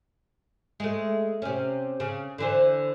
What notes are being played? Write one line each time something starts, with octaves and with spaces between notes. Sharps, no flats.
G#3 A3
C3 C#4
C#3
D3 E3 C5